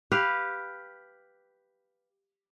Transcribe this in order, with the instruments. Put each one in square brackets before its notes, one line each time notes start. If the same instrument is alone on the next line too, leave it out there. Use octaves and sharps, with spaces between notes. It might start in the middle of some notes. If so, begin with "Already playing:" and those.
[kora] G4 B4 F5